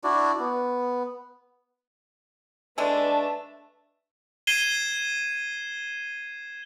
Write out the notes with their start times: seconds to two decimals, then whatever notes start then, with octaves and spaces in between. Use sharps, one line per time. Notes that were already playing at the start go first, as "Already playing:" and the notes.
0.04 D4 E4 F#4 D5
0.39 B3
2.78 D3 G#3 A3 D4 B4 A5
4.47 G#6 C7 D#7 E7 G7